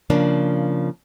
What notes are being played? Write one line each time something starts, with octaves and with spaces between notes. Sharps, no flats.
C#3 F3 A#3 D4